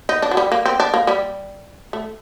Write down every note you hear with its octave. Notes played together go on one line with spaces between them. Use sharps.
D#4
D4
F#3
G3
A#3
C4
D4
A#3
G3
A3